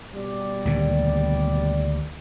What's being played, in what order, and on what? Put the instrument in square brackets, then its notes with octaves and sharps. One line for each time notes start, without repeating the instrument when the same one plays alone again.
[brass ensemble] B2 G3 D5
[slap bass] D2 A#2 D#3